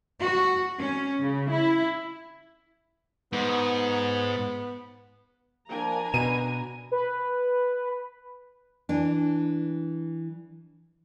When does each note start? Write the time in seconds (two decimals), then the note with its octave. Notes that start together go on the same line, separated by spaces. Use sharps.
0.21 F#4
0.80 C#4
1.20 C#3
1.51 E4
3.33 G#2 B3
5.69 F3 A#3 D4 G#5 A#5
6.14 B2 B4 D#7
6.92 B4
8.89 E3 D4